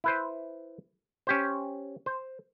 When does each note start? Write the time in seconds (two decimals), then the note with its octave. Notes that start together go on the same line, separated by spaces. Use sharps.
0.04 E4 B4 C5
1.27 C#4 G4 C5
2.06 C5